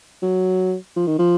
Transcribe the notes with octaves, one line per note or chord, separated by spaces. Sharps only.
F#3
F3
D#3
F3